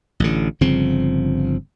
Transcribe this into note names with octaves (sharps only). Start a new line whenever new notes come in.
A1 D3
G1 C#3 F3 C4